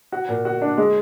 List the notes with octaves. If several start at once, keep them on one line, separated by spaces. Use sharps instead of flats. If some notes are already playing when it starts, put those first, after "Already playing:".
F#4
A#2
F#4
D4
G#3